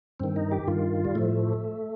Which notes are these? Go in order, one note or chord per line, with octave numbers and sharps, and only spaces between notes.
G2 D#3 C4
D#4
G4
G2 D#3 F4
G3
A2 F3 A3